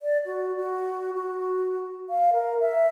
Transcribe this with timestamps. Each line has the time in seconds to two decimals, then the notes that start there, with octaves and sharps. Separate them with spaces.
0.02 D5
0.26 F#4
0.56 F#4
1.14 F#4
2.10 F5
2.33 A#4
2.60 E5